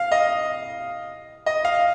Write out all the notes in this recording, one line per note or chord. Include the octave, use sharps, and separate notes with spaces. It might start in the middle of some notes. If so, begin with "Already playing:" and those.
Already playing: F5
D#5
D#5
F5